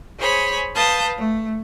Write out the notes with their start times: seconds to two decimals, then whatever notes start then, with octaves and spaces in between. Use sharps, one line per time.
0.18 G#4 C5 C#5 B5
0.75 B4 F5 A5 D#6 G6
1.17 A3